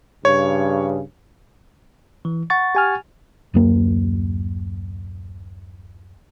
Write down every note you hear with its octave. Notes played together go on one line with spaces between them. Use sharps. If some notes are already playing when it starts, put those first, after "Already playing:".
G2 C#3 C#5
E3
F#5 C#6 A6
G4 G#5 F6
D1 F#2 A#3